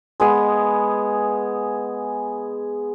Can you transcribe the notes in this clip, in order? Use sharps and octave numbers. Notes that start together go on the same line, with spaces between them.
G#3 B3 G#4 B4